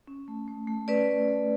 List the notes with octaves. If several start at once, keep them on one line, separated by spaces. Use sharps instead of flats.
C#4
A3
A3
A3
C#4 B4 D5
A3
A3